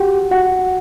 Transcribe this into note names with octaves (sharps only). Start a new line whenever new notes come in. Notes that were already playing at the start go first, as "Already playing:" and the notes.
Already playing: F#4 G4 F#5 G5
F#4 F#5